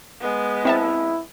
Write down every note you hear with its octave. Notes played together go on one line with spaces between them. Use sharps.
G#3 B3
C4 E4 E5 A5